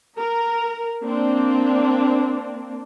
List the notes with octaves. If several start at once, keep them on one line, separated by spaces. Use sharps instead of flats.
A#4
A#3 C4 D4